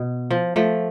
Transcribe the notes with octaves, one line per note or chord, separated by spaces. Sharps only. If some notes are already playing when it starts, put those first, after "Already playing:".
Already playing: B2
F3
F3 A3